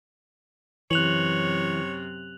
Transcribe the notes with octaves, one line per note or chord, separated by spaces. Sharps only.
F#2 C3 E3 C#5 F#6 F7 F#7